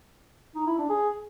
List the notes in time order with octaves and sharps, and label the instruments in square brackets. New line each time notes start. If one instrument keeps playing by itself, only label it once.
[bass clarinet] D#4
E4
D4
G#4